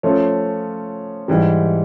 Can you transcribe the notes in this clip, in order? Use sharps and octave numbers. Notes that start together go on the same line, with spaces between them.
F3 A3 C#4 F4
G#2 E3 G3